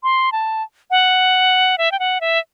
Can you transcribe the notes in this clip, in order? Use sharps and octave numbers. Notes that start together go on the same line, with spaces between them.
C6
A5
F#5
E5
G5
F#5
E5